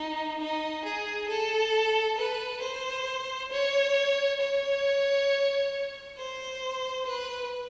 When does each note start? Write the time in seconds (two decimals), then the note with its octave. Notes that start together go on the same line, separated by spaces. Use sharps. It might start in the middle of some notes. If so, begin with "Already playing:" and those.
Already playing: D#4
0.40 D#4
0.85 G#4
1.29 A4
2.18 B4
2.62 C5
3.51 C#5
4.41 C#5
6.18 C5
7.06 B4